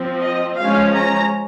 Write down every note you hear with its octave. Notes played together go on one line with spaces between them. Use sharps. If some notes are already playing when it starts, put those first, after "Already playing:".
Already playing: F3 C4
D#5
F3 G#3 C#4 F5
A#5